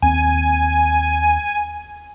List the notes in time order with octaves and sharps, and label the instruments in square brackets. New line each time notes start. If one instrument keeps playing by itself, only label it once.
[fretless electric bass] D#2 C4 [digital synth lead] G#5